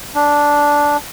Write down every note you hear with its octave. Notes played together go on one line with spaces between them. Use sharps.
D4